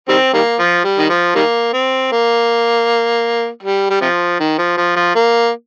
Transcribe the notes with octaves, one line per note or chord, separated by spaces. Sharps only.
D#3 G3 C4
D#3 G3 A#3
F3
G3
D#3
F3
D#3 G3 A#3
C4
A#3
G3
G3
C3 F3
D#3
F3
F3
F3
A#3